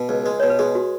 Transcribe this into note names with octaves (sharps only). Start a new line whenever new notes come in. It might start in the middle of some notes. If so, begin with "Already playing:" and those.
Already playing: B2
C#2
G#3
B2 C#5
B4
G#3 G#4
F#4